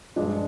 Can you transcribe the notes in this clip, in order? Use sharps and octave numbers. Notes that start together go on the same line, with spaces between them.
G2 F3 G#3 D4